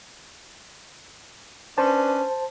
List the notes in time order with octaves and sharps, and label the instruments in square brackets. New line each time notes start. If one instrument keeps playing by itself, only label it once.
[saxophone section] C#4 D4 B4 [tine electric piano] C5 A5